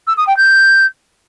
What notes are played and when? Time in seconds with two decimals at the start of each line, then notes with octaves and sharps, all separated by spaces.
0.07 E6
0.17 D#6
0.27 G5
0.37 G6